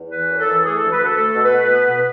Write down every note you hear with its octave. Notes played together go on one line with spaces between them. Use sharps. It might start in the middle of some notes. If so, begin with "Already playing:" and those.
Already playing: E2
E3 B4
F#2
A4
E3
A3 G#4
A4
D2
B4
D2
A4
A3 A4
B2
B4
B2
B3
B2